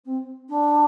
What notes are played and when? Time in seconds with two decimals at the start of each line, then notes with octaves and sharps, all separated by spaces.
0.05 C4
0.48 D4